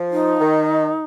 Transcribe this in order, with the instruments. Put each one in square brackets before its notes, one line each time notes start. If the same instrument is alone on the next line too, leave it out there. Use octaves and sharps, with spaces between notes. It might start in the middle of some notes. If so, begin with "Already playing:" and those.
Already playing: [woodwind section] F3
[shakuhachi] D#4
[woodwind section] D#3